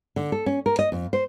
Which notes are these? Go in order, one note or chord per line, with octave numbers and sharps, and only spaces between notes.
D3
A4
C#4
A#4
D#5
F2
C5